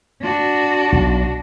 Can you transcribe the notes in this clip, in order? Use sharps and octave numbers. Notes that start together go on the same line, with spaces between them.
D4 F#4
B1